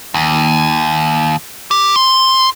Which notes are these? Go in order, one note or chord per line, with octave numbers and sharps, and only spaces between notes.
D#2
G4
C6